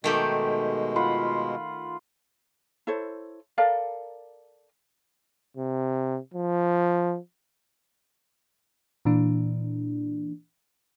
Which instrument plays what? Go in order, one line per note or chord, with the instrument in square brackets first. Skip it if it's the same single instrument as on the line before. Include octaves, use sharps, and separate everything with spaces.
[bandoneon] B2 G#3 [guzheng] D#3 A3 G4
[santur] F4 F#5 B5
[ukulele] E4 A4 C5 C#5
A4 A#4 D5 F5
[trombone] C3
F3
[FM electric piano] A#2 E3 D4